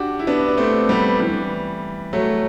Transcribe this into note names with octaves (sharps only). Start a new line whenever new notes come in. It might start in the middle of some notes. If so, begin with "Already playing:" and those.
Already playing: D4 F#4 G4
E4
B3 D4
D4
A3 C4
G3 B3
E3 G3
F#3 A3